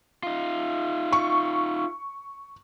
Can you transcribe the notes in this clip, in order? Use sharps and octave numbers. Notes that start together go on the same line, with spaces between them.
D#4 F4
C#6